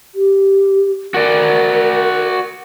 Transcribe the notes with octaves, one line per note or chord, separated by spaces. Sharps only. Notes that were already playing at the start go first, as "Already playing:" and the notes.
G4
F#4 A#4 D5